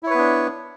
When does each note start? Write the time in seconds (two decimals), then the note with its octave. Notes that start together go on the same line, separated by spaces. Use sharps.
0.03 E4
0.07 C#5
0.10 B4
0.14 B3
0.18 D4